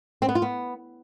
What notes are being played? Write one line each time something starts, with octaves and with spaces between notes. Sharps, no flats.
C4
B3
F4
B3